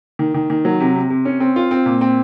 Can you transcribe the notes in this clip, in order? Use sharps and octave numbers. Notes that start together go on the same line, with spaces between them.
D#3
D#3
D#3
F#3
C3
C3
C3
C#4
C4
F4
C4
A#2
C4